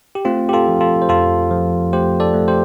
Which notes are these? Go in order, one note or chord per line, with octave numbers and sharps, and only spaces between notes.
G4
A3 C4 F4
G4
F4 A4
F3
F4 A4
C5
F2 F4 A4
F3
A3 G4 C5
A4 D5
A3
G4 C5